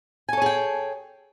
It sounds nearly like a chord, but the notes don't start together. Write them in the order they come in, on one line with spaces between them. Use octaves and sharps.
G#5 A4 C#5 G#4 G5